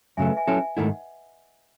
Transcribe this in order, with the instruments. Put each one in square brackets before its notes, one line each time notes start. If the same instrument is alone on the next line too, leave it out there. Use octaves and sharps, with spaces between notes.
[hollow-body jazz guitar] F#2 C#3 F#3 A3 [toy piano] E5 G#5
[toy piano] B4 D#5
E5 G#5
[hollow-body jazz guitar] F#3 C#4 E4 A4 [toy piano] E5 G#5
[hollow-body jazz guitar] G#2 D#3 A3 E4 [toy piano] D#5 F#5